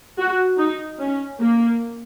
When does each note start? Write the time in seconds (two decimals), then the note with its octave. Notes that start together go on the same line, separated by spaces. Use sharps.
0.18 F#4
0.58 D#4
0.99 C#4
1.40 A#3